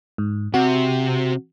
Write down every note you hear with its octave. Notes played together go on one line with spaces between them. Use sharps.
G#2
C3 F#4